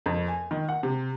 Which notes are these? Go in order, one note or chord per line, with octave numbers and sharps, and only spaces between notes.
F2
G#5
D#3
F#5
C3